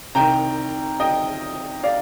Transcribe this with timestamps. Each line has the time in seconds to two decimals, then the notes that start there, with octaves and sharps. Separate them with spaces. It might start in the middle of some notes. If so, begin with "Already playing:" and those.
0.15 C2 C3 D#3 G5 A#5
1.00 D#5 G5
1.83 D5 F5